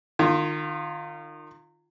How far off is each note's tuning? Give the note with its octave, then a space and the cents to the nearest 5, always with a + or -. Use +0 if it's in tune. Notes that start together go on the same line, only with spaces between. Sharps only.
D#3 -30 F4 +0